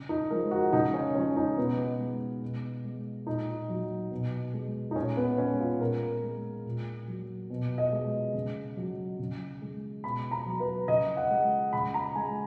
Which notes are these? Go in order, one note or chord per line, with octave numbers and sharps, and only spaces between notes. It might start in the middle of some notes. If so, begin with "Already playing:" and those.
Already playing: C#3
D#4
F3 G#3 A#4
F#4
C#3 D#4
C#4
F3 G#3 C#4
D#4
B2 B3
G#3
B2
G#3
A#2 D#4
F#3
B2
G#3
D#4
A#2 C#4
B3
G#3 C#4
F4
A#2 A#4
G#3
A#2
F#3
B2
D#5
G#3
C#3
F#3
C#3
G#3
B2 B5
A#5
F#3
B4
C#3 D#5
F#5
G#3
C#3 B5
A#5
G#3 G#5